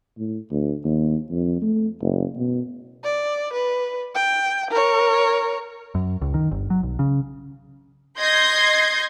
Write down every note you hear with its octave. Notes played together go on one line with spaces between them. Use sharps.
A2
D2
D#2
F2
A3
F#1
B2
D5
B4
G5
A#4 C#5
F#2
C#2
D#3
G1
F#3
B1
C#3
D#5 C6 G6 G#6 A#6 C7